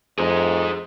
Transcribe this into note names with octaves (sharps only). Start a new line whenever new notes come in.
F2 G#4 C5